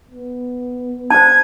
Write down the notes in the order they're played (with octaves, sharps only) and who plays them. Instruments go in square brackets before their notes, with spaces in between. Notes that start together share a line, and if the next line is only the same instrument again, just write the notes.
[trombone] B3
[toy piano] C5 A5 [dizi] G#6